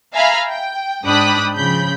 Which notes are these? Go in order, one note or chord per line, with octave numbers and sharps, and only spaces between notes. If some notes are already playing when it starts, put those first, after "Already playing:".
E5 F5 G#5 A#5 B5 F6
G5
G#2 D4 G5 B5 D#6 F#6
C#3 F3 B5 G6